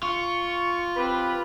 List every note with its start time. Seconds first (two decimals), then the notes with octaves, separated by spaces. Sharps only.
0.03 F4 C#6
0.96 C4 G4 B4 B5